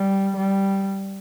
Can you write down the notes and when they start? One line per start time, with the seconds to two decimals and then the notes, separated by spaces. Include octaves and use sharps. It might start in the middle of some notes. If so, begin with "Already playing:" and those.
Already playing: G3
0.37 G3